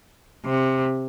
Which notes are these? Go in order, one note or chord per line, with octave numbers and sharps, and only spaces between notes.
C3